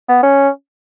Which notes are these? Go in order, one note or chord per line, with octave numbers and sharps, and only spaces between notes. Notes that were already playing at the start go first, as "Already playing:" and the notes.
B3
C#4